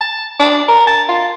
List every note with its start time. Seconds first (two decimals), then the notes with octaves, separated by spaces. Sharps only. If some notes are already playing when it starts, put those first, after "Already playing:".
0.01 A5
0.40 D4
0.68 A#4
0.87 A5
1.09 F4